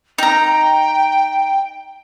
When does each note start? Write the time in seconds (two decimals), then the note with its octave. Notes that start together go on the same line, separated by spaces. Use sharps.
0.18 D#4 G5 A#5